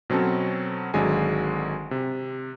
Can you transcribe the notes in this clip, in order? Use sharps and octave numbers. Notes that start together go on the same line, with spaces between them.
B2 F#3 C4 C#4 A4
G#1 D3 F#3 G#3 G#5
C3